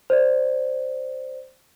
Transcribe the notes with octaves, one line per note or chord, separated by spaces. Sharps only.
C5 D5